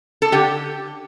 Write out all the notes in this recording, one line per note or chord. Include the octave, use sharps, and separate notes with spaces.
A4
D3 G4